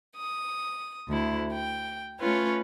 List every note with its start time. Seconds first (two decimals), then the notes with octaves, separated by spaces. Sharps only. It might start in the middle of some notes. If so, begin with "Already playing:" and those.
0.15 D#6
1.10 D2 E4
1.52 G5
2.19 A3 C#4 F4 B4 C#5